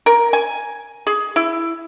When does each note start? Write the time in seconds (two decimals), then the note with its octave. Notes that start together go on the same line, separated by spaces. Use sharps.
0.06 A#4
0.33 G#5
1.07 G#4
1.36 E4